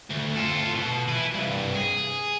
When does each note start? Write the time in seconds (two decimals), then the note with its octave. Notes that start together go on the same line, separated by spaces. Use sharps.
0.10 D2
0.37 F4 A4
0.76 B2
1.08 E4 B4
1.33 C2 G2
1.75 G#4